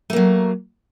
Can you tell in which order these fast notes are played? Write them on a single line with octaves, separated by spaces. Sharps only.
A3 A#3 F#3